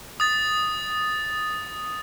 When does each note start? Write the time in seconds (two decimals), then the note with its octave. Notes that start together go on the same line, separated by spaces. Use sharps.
0.20 D#6 A6